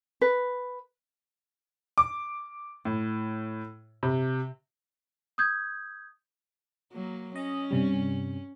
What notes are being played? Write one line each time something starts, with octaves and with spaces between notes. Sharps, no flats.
B4
D6
A2
C3
D#6 G6 G#6
F#3 A#3
C#4 D#5
G2 C3 G3